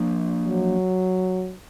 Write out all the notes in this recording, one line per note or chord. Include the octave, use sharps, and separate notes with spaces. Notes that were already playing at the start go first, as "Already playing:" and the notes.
Already playing: F3 A#3 D4
F#3